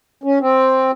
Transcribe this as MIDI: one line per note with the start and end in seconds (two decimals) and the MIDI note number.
0.24 0.39 61
0.41 0.91 60